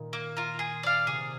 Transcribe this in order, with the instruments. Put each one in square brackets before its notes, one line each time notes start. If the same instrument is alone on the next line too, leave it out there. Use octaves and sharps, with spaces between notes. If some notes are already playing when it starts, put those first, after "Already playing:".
Already playing: [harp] A#2 D#3
[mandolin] A#3
F4 A#4
G#4
D5 F5
[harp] C3 [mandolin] G#4